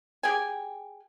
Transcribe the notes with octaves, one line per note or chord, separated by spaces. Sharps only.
G4 G#4 G5 G#5